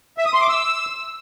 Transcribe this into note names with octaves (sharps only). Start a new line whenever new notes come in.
E5
D#6
C6
D6
E6